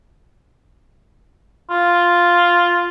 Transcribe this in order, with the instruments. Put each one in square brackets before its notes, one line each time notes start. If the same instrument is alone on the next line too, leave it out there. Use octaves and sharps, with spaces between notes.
[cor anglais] F4